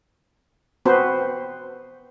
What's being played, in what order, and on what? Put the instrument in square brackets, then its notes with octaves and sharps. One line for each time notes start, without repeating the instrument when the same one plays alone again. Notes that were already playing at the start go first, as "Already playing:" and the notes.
[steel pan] B3 C4 F#4 B4 C5